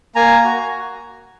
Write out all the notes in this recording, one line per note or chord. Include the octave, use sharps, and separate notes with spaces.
A#3 G#5 A#5
F#4